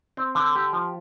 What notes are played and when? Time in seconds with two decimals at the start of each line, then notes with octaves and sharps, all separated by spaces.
0.17 C4
0.35 D3
0.55 G4
0.73 F3